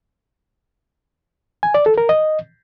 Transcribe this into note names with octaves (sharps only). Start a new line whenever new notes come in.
G#5
D5
A4
A#4
D#5